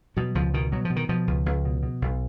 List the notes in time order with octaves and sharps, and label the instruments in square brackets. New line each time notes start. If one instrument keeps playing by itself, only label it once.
[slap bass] B2 F#3
C#2 F3
B2 D#3
B2 F#3
F3
B2
D#3
B2 F3
C#2
C#2
B2
B2
B1